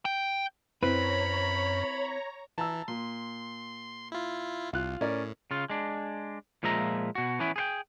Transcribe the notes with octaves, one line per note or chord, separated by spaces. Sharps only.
G5
F#2 C4 E4 B4 C#5 A#5 B5
E3 A5 A#5 E6
A#2 C6
E4 F4
C2 F4 F5 F#6
A2 C#4 A#4 D5
C#3 F4
G#3 D4
A#2 F3 G#3 E5 A#5
B2 F#4
E3 B3 C#4 E4
G#4 C5 G5